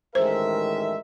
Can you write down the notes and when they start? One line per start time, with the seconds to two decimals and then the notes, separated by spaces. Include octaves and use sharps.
0.15 A1 D#3 G#3 A#4 C5 E5